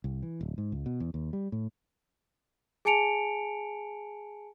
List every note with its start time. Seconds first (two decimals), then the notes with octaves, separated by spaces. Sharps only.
0.04 C2
0.23 E3
0.41 D1
0.58 G#2
0.72 C#2
0.86 B2
1.00 E2
1.14 D#2
1.33 G3
1.52 A2
2.85 G#4 G#5 A5 C#7 D7 F7